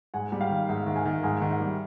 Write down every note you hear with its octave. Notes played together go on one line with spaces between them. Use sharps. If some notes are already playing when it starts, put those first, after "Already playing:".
G#2 F#5 G#5
G3
F5 G5
D#3
G#2 E5 F#5
D#3
F#5 G#5
D#3
G#2 F#5 G#5
D#3
E5 F#5
G3